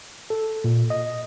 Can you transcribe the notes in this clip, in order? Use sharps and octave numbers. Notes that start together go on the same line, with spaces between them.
A4
A#2
D#5